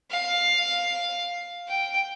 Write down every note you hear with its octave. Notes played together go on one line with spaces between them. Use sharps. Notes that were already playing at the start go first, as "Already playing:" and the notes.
F5
G5